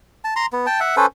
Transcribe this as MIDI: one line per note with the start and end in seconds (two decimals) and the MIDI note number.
0.24 0.34 81
0.36 0.46 82
0.36 0.46 84
0.53 0.66 59
0.66 0.80 79
0.66 0.80 81
0.80 0.96 76
0.80 0.96 78
0.97 1.06 61
0.97 1.06 69
0.97 1.06 71
0.97 1.06 72